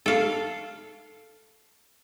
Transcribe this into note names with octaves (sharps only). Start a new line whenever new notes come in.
A4 F5